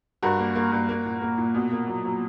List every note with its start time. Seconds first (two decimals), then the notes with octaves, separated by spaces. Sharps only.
0.23 G2 F#4 A#4
0.39 A#3
0.55 A#3
0.72 G2
0.89 A#3
1.05 A#2
1.21 A#3
1.38 A#2
1.55 B2
1.72 A#3
1.88 F#3
2.05 F#3